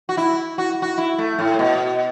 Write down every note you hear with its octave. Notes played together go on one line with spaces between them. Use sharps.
F#4
E4
F#4
F#4
E4
A3
A2
B2